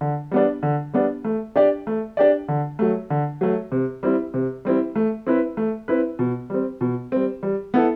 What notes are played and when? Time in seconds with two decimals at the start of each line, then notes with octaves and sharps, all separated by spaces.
0.01 D3
0.31 G3 B3 D4
0.63 D3
0.94 G3 B3 D4
1.25 A3
1.56 D4 G4 D5
1.87 A3
2.17 D4 G4 D5
2.48 D3
2.79 F#3 A3
3.10 D3
3.41 F#3 A3
3.72 C3
4.03 G3 C4 E4
4.34 C3
4.65 G3 C4 E4
4.96 A3
5.27 C4 E4 B4
5.57 A3
5.88 C4 E4 B4
6.19 B2
6.50 G3 C4
6.81 B2
7.12 G3 C4
7.43 G3
7.74 B3 E4 A4